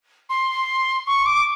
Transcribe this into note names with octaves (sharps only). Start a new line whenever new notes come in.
C6
C#6
D6